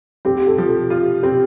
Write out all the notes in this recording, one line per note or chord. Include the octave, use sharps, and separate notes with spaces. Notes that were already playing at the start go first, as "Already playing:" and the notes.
C4 G4
A4
F3
A4
F4 G4
C4 G4